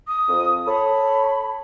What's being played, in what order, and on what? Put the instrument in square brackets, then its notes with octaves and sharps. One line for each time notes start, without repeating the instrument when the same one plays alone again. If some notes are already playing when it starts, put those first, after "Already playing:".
[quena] D#6
[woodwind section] F2
[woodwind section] A4 C#5 [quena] B5